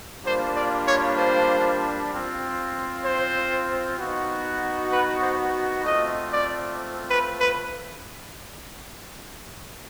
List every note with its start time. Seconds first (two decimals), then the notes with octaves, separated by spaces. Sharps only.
0.24 G3 A#3 D4 F4 C5
0.55 D5
0.86 C#5
1.17 C5
2.11 C4 F4
3.05 C5
3.98 B3 D#4 F#4
4.91 B4
5.23 C5
5.84 A3 C4 F4 D#5
6.31 D5
7.08 B4
7.40 B4